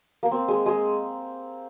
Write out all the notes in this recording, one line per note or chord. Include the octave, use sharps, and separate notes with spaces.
A#3
C4
G#3
G#3